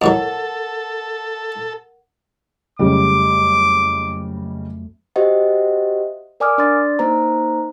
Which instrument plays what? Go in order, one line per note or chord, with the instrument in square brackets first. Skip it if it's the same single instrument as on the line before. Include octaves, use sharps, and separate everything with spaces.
[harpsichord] F2 A2 F#3 [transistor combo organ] A4 [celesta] A#4 F#5
[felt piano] F#1 C#3 G3 [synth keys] F2 F#3 A3 [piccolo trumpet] D6
[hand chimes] F#4 G4 C5 D#5 E5 F#5
A#4 D5 G#5 D6 D#6 F6
D4 D5 C6 A6
A#3 D#4 C5 A#5